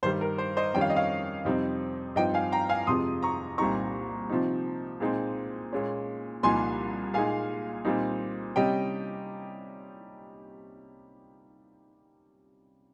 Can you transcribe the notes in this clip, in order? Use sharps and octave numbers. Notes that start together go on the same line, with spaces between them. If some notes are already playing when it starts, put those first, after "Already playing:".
G2 D#3 G3 C5
A#4
C5
C5 D#5
F2 D#3 G3 C#4 G5
F5
D#5
C#5 F5
F2 C3 G3 C4 D#4
G2 F3 C4 D#4 D#5 G5
F5 G#5
G5 A#5
F5 G#5
F2 C3 F3 G#3 C6 D#6
A#5 C#6
C2 A#2 G3 C4 D#4 A#5 C#6
C3 F3 C4 D#4
A#2 G#3 C4 D#4
A#2 G#3 C#4
C2 A#2 F3 A#3 D#4 G#5 C6
A#2 G#3 D#4 F5 G#5
A#2 G3 C4 D#4
C3 G3 C#4 D#5 G5